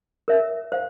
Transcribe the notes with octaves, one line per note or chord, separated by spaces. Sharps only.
A#4 C#5 E5
C5 F5